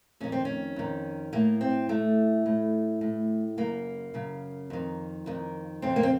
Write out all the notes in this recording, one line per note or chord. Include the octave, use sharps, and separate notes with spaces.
F2 D#3 C#4
C4
C#4
F2 D#3
A2 A#3
C4
A2 A3
A2
A2
F#2 C#3 A#3
F#2 C#3
F2 D#3
F2 D#3
F2 C#3 C4
A#3
C4